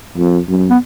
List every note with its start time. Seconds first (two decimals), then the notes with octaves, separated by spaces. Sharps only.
0.17 F2
0.48 F#2
0.70 B3